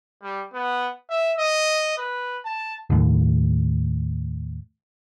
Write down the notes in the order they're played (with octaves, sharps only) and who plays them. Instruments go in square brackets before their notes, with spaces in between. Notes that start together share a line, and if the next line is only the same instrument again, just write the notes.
[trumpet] G3
B3
E5
D#5
B4
A5
[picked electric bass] D#2 A2